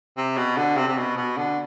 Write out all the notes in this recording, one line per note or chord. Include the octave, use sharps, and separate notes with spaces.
C3
B2
D3
C3
C3
B2
B2
D3